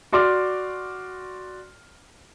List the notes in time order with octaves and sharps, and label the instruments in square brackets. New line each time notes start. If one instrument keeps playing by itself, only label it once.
[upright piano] F#4 D5 C6 D6 F6